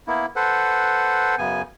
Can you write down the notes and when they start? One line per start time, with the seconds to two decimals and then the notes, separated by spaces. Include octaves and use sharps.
0.07 A#3 B3 E4
0.36 A4 B4 C5 F#5
1.38 F#2 C#3 B3 G#5